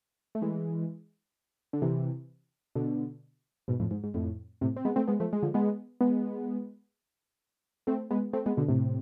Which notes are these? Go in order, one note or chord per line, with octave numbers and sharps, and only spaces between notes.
A3
E3 G#3
D3
C3 E3
B2 D3
G#2 B2
F2 A2
G#2
G#2
F2 A2
A2 C3
C4
G#3 B3
A3 C4
G#3 B3
F3 A3
G#3
D3 F3
G#3 B3
G#3 B3
A3 C4
G#3 B3
A3 C4
G#3 B3
B2 D3
A2 C3